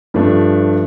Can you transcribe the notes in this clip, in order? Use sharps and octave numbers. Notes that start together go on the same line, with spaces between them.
G2 F3 A3 D4